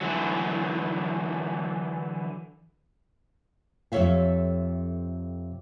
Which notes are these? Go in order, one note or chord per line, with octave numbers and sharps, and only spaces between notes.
D3 E3 F#3
F2 C3 A4 C#5 E5 F5